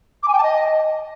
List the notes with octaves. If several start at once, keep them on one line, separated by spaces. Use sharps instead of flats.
D6
G#5
G5
A5
D#5